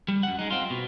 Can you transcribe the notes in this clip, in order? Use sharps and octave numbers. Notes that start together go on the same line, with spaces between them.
G3
F#2 F#5
G#3 D#4
C4 F4
B2